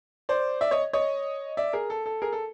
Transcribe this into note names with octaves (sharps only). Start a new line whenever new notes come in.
C5 D5
D5 E5
C#5 D#5
C#5 D#5
D5 E5
G#4 A#4
A4
A4
G#4 A#4
A4